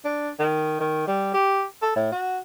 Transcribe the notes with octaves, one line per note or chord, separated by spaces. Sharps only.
D4
D#3
D#3
G3
G4
A4
A2
F#4